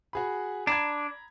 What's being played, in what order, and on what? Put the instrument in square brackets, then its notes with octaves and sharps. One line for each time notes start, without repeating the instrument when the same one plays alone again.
[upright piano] F#4 G#4 B5
[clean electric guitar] D4 [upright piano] A#5 B5 G#6